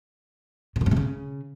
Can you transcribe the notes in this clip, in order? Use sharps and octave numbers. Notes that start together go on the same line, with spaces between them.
B2
D3
G2
C3
C#3